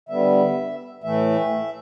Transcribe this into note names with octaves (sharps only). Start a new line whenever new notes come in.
D3 G3 B3 E5
A2 E3 A3 E5